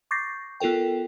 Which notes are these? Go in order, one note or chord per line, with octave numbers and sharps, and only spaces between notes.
C#6 D6 G6 A6 A#6 C7
B3 F4 A4 A#4 G5